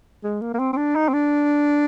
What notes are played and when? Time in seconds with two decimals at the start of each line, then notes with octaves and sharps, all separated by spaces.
0.24 G#3
0.41 A#3
0.54 A#3
0.59 C4
0.73 C4
0.77 D4
0.95 D#4
1.09 C4
1.13 D4